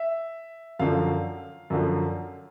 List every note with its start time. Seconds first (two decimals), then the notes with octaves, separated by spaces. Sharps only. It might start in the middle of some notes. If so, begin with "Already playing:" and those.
Already playing: E5
0.79 F#2 D3 F3 F5
1.70 F#2 D3 F3